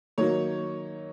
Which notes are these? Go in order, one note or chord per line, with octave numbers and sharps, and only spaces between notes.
D#3 F#3 A#3 C#5